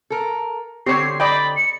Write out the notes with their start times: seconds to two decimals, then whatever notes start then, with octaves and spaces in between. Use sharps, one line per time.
0.10 A4 A#4
0.86 D3 C4 G4 C#5 C7
1.20 D5 D#5 G5 B5
1.56 C#7